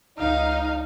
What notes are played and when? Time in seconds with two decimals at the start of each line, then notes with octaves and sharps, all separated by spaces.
0.19 C#2 D#4 F5